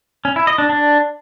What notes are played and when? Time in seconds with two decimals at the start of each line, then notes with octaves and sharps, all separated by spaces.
0.25 C#4
0.36 E4
0.47 D#5
0.58 D4
0.70 D4